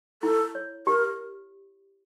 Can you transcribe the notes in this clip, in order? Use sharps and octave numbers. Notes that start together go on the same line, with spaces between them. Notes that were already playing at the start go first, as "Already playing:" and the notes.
E4 A4
C#5
G4 A#4